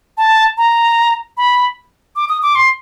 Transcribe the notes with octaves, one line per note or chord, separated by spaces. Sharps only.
A5
A#5
B5
D6
D#6
D6
C6